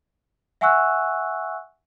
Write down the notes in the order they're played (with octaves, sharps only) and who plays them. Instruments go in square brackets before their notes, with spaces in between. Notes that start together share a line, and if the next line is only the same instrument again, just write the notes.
[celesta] E5 F#5 G#5 C#6 E6 F#6